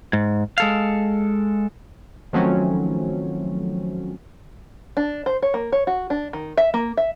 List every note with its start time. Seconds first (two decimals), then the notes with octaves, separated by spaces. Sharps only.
0.13 G#2
0.58 G#3 A4 F5
2.33 D#3 F3 F#3 A3 C4 C#4
4.97 D4
5.26 C5
5.43 C#5
5.54 A#3
5.72 C#5
5.87 F#4
6.10 D4
6.33 D#3
6.57 E5
6.74 A#3
6.97 E5